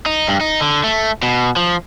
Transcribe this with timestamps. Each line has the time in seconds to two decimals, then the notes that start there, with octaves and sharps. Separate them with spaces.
0.06 D#4
0.28 G2
0.41 D#4
0.61 D3
0.84 A3
1.23 B2
1.56 F3